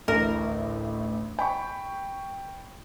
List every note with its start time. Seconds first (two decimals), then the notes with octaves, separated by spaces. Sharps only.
0.08 A1 D2 A2 A#4
1.39 G5 B5 C#6